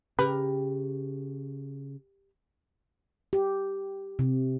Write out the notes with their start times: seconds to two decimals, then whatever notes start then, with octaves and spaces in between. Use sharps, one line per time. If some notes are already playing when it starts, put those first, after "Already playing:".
0.19 C#3 G4 A#4 B4
3.33 G4
4.19 C3